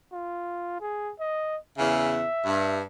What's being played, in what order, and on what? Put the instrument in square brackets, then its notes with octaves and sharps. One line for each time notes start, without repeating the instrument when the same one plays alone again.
[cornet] F4
G#4
D#5
[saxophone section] E2 C#3 [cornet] E5
[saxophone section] G2